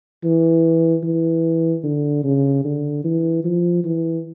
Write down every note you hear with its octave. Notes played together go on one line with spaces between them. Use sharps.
E3
E3
D3
C#3
D3
E3
F3
E3